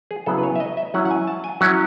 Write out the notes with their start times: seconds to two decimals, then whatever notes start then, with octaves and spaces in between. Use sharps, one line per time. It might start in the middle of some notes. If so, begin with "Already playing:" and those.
0.11 G#4
0.26 C#3 F#3 B3 E4 A4
0.38 B4
0.43 C#5
0.56 E5
0.60 D#5
0.77 E5
0.94 F#3 C#4 E4 F#5
1.05 F#5
1.11 G#5
1.27 A5
1.44 G#5
1.61 F#3 C#4 E4 F#5